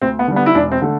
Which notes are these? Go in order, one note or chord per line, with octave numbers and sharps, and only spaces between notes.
D2 C4
B3
D3 G3
B3
E4
E1 D4
C4
D3 A3